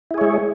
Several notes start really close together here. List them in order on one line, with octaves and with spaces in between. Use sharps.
E4 G#4 C#5 G#3